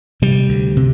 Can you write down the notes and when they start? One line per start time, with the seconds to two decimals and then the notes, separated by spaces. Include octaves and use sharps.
0.22 C3 G3
0.49 D2
0.77 C3